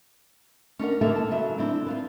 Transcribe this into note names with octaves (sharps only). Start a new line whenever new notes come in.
C#4 D4 A#4 F#5
D3 A#3 G4 A4 E5
A5
C#3 F#3 E5
C4 D4 E4
D4 F4 B4